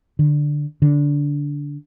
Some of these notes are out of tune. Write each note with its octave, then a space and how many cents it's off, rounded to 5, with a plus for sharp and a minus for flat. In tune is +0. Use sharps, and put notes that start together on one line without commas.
D3 +5
D3 -15